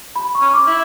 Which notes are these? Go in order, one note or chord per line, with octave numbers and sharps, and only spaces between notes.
B5
C#6
C#4
D6
E4